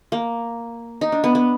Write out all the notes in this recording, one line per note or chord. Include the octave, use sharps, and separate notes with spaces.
A#3
D#4
D4
B3
B3